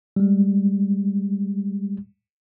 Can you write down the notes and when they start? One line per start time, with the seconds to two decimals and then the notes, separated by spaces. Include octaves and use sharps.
0.16 G3 G#3